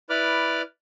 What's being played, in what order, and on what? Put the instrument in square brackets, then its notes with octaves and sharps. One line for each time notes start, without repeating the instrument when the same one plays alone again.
[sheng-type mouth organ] E4 B4 D5 B5 D6 F6